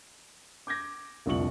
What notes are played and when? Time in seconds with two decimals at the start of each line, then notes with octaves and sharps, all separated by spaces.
0.67 D6 G6 G#6 A#6
1.26 F1 C2 D3 F4 C#6 F#7